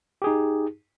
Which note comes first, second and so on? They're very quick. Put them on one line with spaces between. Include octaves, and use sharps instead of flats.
G4 G#4 D#4